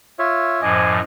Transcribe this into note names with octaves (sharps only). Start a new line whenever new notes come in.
F4 C#5 E5
F#2 A2 F3 C5 D#5 G#5 D6